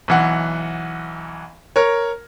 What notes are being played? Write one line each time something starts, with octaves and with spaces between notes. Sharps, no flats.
B1 E3 F#5
A#4 C#5